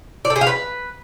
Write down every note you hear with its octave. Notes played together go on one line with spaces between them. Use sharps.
D5
A4
G#4
F5
B4